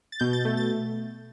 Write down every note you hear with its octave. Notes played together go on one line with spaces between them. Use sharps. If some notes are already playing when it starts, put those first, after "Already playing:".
A6
B2 G6
A6
A3
A6